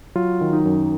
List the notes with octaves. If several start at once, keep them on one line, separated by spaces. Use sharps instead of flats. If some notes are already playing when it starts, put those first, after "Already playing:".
F#3 F4
D#3
D#4
F#2